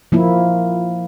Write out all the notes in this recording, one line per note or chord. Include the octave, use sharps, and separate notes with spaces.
F3 A#3 E4